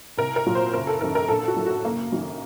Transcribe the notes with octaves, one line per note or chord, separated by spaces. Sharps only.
C2 A#4
A#4
A#2 F#3
C5
F#1 A#4
A4
F#2 D#3 A#4
A#4
A#1 A4
F#4
A2 F#3
F#4
F#1 A#3
F#2 D#3 F#3